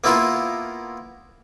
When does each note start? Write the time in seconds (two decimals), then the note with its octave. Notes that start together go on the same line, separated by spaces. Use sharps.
0.04 A#3 B3 E4 F4 A#4